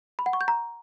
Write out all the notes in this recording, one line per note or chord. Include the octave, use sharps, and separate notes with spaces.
B5
F#5
C#6
G6
A#5